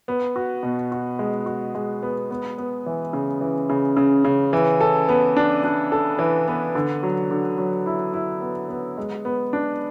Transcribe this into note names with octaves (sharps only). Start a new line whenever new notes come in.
B3
F#4
B2
F#4
G#3
F#4
G#3
B3
B3
B3
E3
C#3
E3
C#3
C#3
C#3
E3
A4
B3
D4
D4
A4
E3
B3
D3
F#3
D3
F#3
E4
E4
B3
B3
G#3
B3
D4